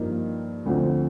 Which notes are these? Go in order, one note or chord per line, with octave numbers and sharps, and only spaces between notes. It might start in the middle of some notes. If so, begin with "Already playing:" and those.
Already playing: G2 F3 A#3 D#4
D2 D3 F3 C4